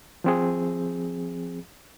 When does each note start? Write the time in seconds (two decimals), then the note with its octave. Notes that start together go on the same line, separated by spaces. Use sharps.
0.24 F3 C4 G#4